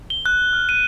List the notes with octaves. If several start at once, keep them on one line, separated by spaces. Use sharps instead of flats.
G7
F#6
F6
D#7